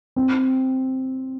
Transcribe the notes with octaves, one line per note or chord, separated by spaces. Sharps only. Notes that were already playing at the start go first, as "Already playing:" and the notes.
C4